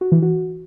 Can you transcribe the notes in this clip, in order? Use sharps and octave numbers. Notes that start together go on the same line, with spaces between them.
F#4
E3
F#4